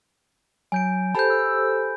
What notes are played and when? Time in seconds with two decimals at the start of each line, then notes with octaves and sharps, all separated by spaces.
0.72 F#3 G#5 G6 D7
1.15 G4 A4 C5 A5 B5 G6
1.30 E6